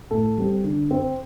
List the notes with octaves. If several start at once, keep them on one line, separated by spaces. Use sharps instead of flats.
A2 A4
G3 C4
D3
C4